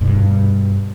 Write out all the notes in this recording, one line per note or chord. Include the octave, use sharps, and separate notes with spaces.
G2 B2